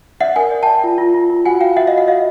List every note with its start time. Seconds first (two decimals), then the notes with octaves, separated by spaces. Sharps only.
0.20 D5 E5 F#5
0.36 A#4 F#5 G#5
0.51 D5
0.63 G5 A5
0.67 D5
0.84 F4
0.98 F4
1.14 F4
1.30 F4
1.45 F#4 F#5 G#5
1.61 F#4 F5 G5
1.76 F#4 E5 F#5
1.87 D#5 F5
1.92 F#4
1.98 E5 F#5
2.07 F#4 D#5 F5